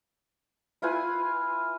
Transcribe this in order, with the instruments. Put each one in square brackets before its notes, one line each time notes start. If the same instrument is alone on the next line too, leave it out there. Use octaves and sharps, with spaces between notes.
[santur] E4 F4 B4 G#5